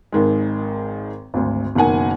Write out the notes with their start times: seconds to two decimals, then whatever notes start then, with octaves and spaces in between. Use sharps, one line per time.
0.12 G#1 D#3 G#3
1.34 G#1 D2
1.75 F#1 B2 D#3 F#5 G#5